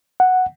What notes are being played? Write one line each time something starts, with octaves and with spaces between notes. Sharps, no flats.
F#5